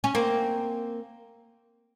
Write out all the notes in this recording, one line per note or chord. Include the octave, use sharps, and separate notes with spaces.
C#4
A#3 C4